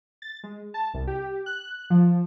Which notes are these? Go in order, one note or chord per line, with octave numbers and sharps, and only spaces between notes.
A6
G#3
A5
C2
G4
F#6
F3